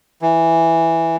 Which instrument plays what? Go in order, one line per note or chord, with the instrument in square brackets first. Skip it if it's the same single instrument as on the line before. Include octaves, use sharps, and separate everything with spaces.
[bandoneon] E3